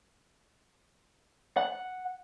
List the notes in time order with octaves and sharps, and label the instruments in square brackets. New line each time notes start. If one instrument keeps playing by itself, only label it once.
[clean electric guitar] F#5